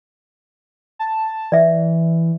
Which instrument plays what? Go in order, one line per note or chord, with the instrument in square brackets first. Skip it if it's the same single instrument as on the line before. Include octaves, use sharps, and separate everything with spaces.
[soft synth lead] A5
[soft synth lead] E3 [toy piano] D5 E5